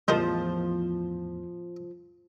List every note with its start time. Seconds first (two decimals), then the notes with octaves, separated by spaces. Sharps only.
0.08 E2 A2 F3 G3 D#4 A#4 C5